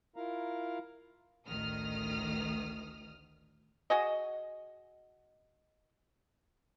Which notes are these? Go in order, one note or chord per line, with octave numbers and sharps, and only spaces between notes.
E4 F4 A#4 F5 A#5
A1 D2 D#3 D#6 F6
F#4 G#4 D#5